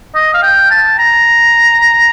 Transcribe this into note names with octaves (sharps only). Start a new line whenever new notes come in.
D#5
F5
G5
A5
A#5